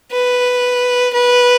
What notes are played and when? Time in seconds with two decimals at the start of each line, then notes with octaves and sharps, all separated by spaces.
0.12 B4
1.14 B4